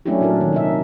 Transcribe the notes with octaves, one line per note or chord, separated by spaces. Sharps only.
F#3 A3 C#4 D4 E4 G4
A#2 F#3 D4 A#4
D#3
C3 D#4 E5